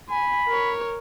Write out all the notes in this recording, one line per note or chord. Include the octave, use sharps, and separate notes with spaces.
G#5 B5
A#4 C#5